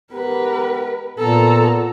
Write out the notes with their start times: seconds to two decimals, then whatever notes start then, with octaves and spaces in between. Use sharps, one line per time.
0.12 G#2 B3 G4 A#4 B4
1.18 A#2 B3 A4 A#5